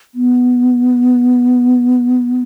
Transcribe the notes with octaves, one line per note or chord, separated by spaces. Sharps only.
B3